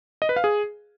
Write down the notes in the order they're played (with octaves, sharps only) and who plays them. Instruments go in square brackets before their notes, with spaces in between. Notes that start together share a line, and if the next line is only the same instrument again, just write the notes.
[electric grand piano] D#5
B4
F5
G#4